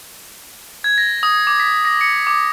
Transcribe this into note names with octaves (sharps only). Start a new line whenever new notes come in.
G#6
A#6
D#6
D6
B6
A#6
C#7
D6